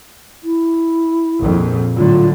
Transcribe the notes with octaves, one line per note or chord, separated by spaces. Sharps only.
E4
A#1 F2
A2 D3 F#3 F4